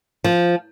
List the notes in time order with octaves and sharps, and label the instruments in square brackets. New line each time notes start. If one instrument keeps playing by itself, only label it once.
[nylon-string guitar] F3